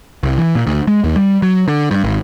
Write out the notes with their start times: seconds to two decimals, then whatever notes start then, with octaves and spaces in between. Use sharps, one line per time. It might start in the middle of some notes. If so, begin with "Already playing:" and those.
0.23 C2
0.38 E3
0.55 A#2
0.67 D2
0.87 G#3
1.04 D#2
1.16 G3
1.42 F#3
1.68 D3
1.91 G2
2.04 G#1